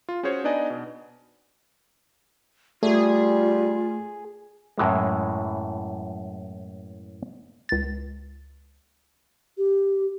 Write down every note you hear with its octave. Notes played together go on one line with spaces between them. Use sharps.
F4
C#4 F#4 G#4 C5 C#5
B3 D4 D#4 D5 D#5 G#5
B2
G3 A3 F4 G#4
F#2 A2 E3 G#3
C#2 A6
G4